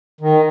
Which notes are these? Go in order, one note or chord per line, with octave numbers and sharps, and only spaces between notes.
D#3